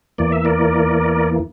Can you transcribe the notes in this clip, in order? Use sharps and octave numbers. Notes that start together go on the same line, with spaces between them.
E2 E3 A#3 D5
E5
A#4 D5